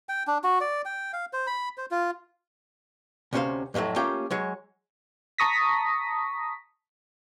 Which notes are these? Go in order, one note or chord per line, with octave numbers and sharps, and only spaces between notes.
G5
D4
F#4
D5
G5
F5
C5
B5
C5
F4
D2 C3 C#4 F#4 C5 F5
F2 A2 D#3 F#3 A3
A3 A#3 C#4 F4 G4 G5
F#3 G#3 C#5
A5 A#5 C#6 D#6 A#6 B6